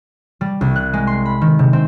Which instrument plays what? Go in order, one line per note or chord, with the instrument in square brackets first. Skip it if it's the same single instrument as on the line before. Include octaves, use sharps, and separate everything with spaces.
[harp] G3
C2
F#6
G#3
C6
B5
D#3
C3
C4